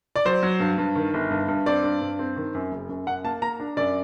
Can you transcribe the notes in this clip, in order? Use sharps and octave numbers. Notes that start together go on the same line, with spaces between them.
D5
F#3 C5
F#3
G2
G2
D#3
G1
G2
G2
C4 D5
G2
G2
C4
D#3
F#2
F#1
F#2
F#2 F#5
A#3 A5
A#3 A#5
D4
F#2 D5